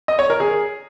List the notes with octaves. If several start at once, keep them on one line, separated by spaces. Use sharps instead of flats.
D#5
C#5
A#4
G#4